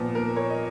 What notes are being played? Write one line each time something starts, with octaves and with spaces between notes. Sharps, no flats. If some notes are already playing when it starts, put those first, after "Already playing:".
Already playing: A#2 F3 B3
A#4
A#4 C#5
D#5